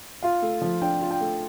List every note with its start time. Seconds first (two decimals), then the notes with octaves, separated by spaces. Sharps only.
0.23 F4 F5
0.42 A3
0.62 F3
0.82 D4 G5
1.01 F4
1.11 G5
1.21 A3